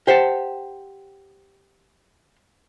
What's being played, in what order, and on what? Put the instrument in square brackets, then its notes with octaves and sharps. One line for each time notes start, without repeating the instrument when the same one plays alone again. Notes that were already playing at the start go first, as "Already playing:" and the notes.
[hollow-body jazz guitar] G4 C5 F#5 A5